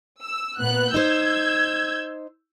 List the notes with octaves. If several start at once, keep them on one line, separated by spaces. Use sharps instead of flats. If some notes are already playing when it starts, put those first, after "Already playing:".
E6
A#2 B3 F#6
D#4 C5 E6 G6 G#6